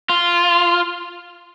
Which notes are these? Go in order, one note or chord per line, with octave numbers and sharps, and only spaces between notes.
F4